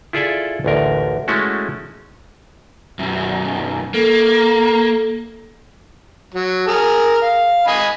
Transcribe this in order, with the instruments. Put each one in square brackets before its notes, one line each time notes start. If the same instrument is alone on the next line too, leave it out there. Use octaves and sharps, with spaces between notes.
[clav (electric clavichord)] E4 F4 G#4 A4 D5 E5
A1 D2 A#4
G#3 A3 C#4 E4 F#4
[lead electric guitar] B1 F#2
[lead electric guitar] A#3 [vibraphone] A4
[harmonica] F#3
G#4 A#4
F5
D#5 G#5 B5